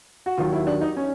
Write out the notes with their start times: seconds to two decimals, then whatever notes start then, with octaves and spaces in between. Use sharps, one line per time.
0.26 F#4
0.38 D#2 D#3 F#3 F4
0.53 E4
0.67 D4
0.81 D#4
0.97 C#4